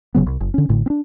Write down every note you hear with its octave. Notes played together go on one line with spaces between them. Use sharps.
F#1 C#3 F#3 B3
C2
F#1
D3 C#4
A1 A2 D3
C4 D4